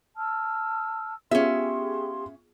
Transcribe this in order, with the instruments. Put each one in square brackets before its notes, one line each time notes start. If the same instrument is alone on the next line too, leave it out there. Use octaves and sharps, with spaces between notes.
[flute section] A5 E6 F6
[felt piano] B3 F4 G#4 [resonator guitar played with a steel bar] C#4 E5 [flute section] G4 C6